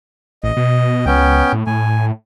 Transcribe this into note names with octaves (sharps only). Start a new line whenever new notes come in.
A1 D#5
B2
C#2 B3 C#4 G5
A2
A2 G#5